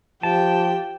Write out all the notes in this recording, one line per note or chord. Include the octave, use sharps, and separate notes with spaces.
F3 G4 G5 A5